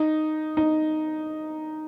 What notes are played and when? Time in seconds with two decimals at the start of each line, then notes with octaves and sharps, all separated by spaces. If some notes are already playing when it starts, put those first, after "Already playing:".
Already playing: D#4
0.57 D#4